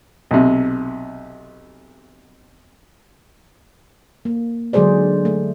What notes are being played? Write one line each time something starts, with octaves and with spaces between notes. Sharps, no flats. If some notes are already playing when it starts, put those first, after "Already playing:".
B1 C3
A#3
D3 F#3 G#3 G#4 C5 D5
A3